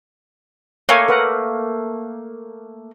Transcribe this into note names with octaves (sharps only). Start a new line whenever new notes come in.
A3 A#3 C#5 G#5
A#4 B4 F#5